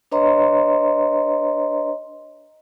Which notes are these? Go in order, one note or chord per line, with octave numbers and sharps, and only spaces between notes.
D4 B4 C#5 D#5 A#5 C6